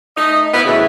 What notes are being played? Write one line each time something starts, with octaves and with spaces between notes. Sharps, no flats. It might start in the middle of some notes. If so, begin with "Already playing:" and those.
A3 D#4 D#5
B3 E4 B4
A2 C#3 E3 F#4 E5